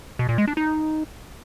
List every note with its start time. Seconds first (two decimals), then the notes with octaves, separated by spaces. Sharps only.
0.19 B2
0.29 A#2
0.38 G#3
0.48 D4
0.57 D#4